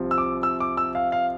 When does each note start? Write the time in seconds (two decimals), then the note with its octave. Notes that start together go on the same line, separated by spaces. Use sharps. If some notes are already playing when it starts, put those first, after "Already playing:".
Already playing: C2 C3 F3
0.11 E6
0.18 D6
0.43 E6
0.60 D6
0.77 E6
0.95 F5
1.12 F5